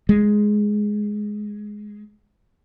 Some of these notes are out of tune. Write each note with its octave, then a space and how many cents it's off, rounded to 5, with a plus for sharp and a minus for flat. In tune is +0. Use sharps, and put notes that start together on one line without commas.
G#3 +5